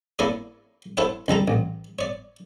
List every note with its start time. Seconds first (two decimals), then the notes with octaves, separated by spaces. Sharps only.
0.19 A#3 E4 A4 A#4 C#5 D5
0.97 E4 A4 C5 C#5 F#5
1.28 C#2 G3 A4 A#5
1.48 A1
1.99 C#5 D5